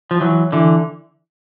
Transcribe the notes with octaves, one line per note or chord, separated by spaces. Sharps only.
F3
E3 F#3
D3 E3